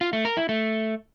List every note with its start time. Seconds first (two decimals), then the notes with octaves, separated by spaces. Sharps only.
0.01 F4
0.13 A3
0.25 A#4
0.37 E4
0.49 A3